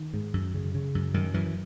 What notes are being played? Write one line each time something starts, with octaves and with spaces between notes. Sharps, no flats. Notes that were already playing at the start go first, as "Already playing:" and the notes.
Already playing: D#3
G#2
F#2
C#3
C#3
F#2
F#2 D#3
F#2 E3